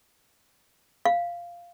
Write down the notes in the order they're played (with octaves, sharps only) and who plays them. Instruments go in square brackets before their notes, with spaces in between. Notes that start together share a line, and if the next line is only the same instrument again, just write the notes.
[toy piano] F5